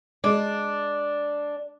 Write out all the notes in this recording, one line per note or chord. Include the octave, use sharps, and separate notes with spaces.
G#3 D4